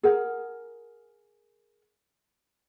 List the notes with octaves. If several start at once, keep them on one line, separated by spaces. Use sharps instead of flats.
G#4 A#4 F#5